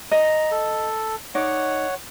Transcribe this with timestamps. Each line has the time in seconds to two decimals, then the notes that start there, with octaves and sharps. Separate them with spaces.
0.12 D#5 A#5
0.51 A4
1.35 D#4 C#5 D5 F#5